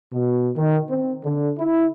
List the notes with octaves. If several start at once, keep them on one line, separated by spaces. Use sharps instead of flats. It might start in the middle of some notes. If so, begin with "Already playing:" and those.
B2
D#3
C4
D3
E4